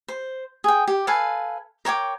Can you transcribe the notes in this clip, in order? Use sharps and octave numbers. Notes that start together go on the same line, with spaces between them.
C5
G#4 G5
G4
A4 B4 F5 G#5
A#4 C#5 G5 D6